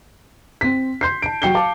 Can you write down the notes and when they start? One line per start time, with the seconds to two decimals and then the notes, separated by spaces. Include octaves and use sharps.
0.61 C4 B6
1.01 C6 G6 C7
1.22 A5 D7
1.42 F#3 F#4 G5 C7 C#7 G7
1.55 F5 A5 D6